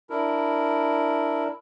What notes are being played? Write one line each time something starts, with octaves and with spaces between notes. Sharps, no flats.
D4 E4 A#4